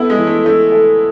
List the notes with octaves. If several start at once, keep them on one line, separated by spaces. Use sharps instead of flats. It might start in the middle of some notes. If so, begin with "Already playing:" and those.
Already playing: B3 E4 A4
G#3
E3
A3
A3 E4
A4